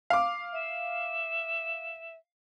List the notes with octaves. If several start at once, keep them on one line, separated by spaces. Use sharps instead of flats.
F5 D6
E5